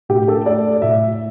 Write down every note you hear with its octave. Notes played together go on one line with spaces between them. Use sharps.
A2 G4
A4
A3 D5
A2 E5